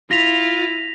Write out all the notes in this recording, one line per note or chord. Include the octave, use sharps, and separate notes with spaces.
E4 F4 A#6 B6 F7